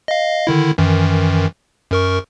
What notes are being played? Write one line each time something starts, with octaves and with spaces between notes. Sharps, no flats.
D#5 F5
D3 D#3 E4
F#2 D#3 E3
F#2 A#4 C#6